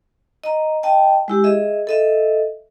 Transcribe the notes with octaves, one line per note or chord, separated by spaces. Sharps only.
D#5 A#5
D#5 G5 A5
G#3 E4 G4
G#4 D#5 E5
A4 D#5 E5